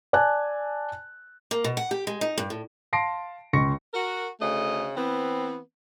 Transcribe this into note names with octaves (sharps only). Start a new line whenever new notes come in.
D5 G#5 A5 F#6
A#3
B2
F#5
G4
G#3
D#4
G2
A2
F5 A5 C6 A#6 C7 D7
C#2 C6 C#6 A#6 C#7
F#4 A#4
D2 C#3 A3 D#5
E3 B3 C4